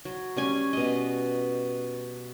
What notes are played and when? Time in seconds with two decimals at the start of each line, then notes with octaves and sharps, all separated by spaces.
0.05 F#3
0.37 G3 C#4 G#5
0.73 B2 D#5